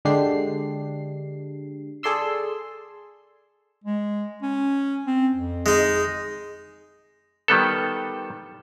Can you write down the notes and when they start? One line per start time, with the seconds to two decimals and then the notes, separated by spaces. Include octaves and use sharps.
0.05 D3 G#3 D4 G4 C7
2.03 G#4 A4 D5 C6 E6
3.84 G#3
4.43 C#4
5.07 C4
5.34 F2
5.66 G#3 D#4
7.48 D#3 G3 B3 A4